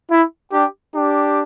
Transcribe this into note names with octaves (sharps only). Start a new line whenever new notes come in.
E4
D4 G4
D4 G4